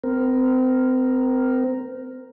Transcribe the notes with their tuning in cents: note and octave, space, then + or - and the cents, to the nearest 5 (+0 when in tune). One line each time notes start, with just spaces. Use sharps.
C4 -30 A#4 +0